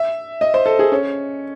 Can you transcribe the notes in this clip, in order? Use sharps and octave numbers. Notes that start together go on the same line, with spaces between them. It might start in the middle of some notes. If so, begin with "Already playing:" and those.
Already playing: E5
D#5
C5
A4
G#4
C#4